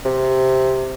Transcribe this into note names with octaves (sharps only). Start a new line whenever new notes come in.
C3